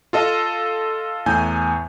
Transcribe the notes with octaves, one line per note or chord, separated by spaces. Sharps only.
F4 A4 D#5 F5
E2 A2 G#5 G6